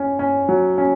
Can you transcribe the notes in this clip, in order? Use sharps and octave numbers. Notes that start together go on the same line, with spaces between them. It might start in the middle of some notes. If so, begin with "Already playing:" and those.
Already playing: C#4
C#4
F#3
C#4